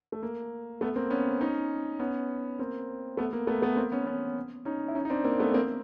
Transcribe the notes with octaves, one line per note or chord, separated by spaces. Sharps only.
A3
A#3
A3 B3
A#3 C4
B3 C#4
C#4 D#4
B3 C#4
A#3 C4
A3 B3
A#3
A3 B3
A3 B3
A#3 C4
B3 C#4
B3 C#4
C#4 D#4
E4
C#4 D#4
D#4
C4 D4
A#3 C4
A3 B3
A#3 C4